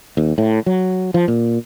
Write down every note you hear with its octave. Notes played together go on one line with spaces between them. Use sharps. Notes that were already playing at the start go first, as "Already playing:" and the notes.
D#2
A2
F#3
F3
A#2